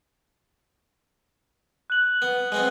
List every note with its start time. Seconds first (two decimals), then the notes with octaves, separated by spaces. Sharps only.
1.90 F#6 F#7
2.22 B3
2.52 G#3 B3 C4